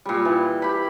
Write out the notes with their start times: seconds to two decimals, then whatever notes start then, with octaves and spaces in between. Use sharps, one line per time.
0.06 A#2 G3
0.25 E3
0.62 G4 B5